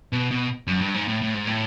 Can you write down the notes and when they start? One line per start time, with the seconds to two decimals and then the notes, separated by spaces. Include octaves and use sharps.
0.12 B2
0.31 B2
0.67 F#2
0.81 G2
0.94 G#2
1.08 A2
1.22 A2
1.34 G#2
1.47 A2